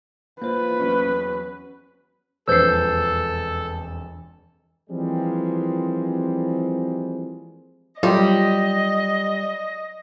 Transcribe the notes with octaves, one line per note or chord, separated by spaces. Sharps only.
A#3 F4 B4 C5
E2 F#3 C#4
E1 F2 A4 B4 C5 E6 G6 C7
E3 F3 G3 G#3 A#3 C4
F#3 G3 F4 G4 D#5